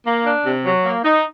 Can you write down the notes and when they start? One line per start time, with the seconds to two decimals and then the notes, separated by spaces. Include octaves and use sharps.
0.05 A#3
0.25 D4
0.45 C3
0.66 F#3
0.85 A#3
1.04 D#4